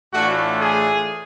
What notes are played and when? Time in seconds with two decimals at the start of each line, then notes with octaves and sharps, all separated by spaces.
0.14 A2 E3 A3 D4 F4 F#4
0.60 G#4